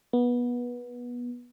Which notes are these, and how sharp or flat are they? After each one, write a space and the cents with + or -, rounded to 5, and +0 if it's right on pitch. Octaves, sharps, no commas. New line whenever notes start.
B3 -20